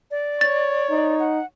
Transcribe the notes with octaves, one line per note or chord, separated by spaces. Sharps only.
D5
C#5 A6
D#4
F#5